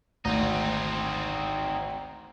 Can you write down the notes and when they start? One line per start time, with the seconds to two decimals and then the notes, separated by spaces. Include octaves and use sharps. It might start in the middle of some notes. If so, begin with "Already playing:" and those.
0.25 G#1 D2 C4 D#4